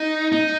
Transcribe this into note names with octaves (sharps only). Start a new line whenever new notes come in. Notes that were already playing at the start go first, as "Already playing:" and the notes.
Already playing: D#4
D#4